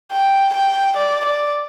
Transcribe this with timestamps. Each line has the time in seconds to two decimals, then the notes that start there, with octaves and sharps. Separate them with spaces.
0.13 G5
0.54 G5
0.97 D5
1.25 D5